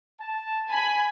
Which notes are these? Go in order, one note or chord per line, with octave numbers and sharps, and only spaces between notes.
A5
G#5 B5